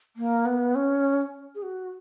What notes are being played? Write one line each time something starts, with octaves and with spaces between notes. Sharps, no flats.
A#3
B3
C#4
G#4
F#4